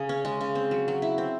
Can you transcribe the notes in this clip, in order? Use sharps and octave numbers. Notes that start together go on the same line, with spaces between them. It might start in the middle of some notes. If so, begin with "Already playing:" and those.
Already playing: C#3 G#4
C#4
G#3
C#3
C4
F#3
F#3
E4
C4